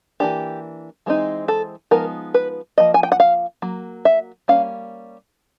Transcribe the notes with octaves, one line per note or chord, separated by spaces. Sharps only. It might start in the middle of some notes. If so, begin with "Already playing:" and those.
E3 G3 A#3 D4 G4
E3 G#3 C4 D#4
A4
F3 G#3 B3 D#4 A#4
B4
F3 A#3 D#5
G#5
G5
F#5
F5
F#3 A#3
E5
G3 A#3 C#4 F5